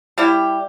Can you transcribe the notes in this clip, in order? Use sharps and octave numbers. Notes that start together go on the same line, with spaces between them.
G3 E4 G4